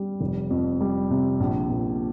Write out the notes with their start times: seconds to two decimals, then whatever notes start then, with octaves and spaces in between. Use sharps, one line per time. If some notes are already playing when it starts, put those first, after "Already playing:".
Already playing: G3
0.21 F1
0.50 F2
0.81 G3
1.10 C3
1.40 A#1
1.69 A#2